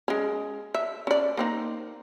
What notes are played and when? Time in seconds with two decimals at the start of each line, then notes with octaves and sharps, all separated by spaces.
0.08 G#3 C#4
0.74 E5
1.07 C#4 D5
1.37 A#3 C4 D#4